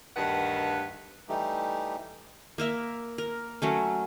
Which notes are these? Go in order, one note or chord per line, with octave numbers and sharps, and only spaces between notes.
D2 G2 D#3 B4 F#5
E3 G3 A3 D#4 G4
A#3 A#4 E5
A#4
F#3 A3 C#4